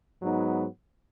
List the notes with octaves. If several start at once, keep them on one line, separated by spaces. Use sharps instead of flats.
G#2 F#3 B3 D#4